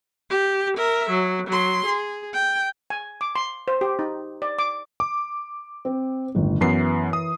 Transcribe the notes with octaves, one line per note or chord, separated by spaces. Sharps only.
G4
A#4 E5
F#3
F#3 C6
G#4
G5
G#5
D6
C6
C5
G4
D#4
D5
D6
D6
C4
G1 D#2 A2
F#2 E3 B3 C7
D#6